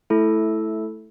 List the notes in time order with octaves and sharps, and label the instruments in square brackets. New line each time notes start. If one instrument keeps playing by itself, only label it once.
[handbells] A3 E4 A4